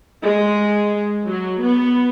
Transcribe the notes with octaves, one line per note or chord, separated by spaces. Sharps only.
G#3
F#3
B3